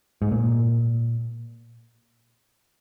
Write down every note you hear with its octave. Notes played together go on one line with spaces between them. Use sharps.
G#2
A#2